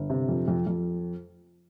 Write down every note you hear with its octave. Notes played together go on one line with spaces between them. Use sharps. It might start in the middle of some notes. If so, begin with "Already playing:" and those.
Already playing: G1
C3
F2
F2
F2